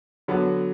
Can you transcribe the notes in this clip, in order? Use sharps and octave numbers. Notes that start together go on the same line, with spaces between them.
D3 F#3 B3 F#4